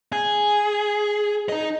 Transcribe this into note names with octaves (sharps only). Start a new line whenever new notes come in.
G#4
D#4 D#5